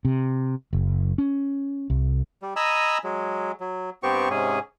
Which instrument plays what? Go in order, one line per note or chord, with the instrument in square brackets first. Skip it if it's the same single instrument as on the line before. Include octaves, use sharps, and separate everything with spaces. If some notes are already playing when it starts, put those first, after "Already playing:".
[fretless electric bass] C3
F#1
C#4
C2
[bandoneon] G3
D#5 G#5 A#5 B5 E6
F#3 G#3
F#3
G2 B3 C4 G4 C#6
G#2 C3 C#4 G#4